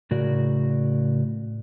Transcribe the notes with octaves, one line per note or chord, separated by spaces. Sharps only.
A2 C#3 F#4 A#4 D5